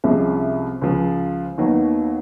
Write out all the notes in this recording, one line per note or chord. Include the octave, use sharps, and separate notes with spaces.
C2 C3 F3 G#3 C#4
C#2 C#3 F3
D#2 D#3 F#3 B3 D#4